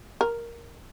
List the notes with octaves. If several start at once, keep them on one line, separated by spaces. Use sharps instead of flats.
A#4